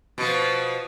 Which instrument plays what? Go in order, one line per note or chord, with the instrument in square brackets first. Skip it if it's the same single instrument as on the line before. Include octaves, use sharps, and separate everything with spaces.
[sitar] B2 F3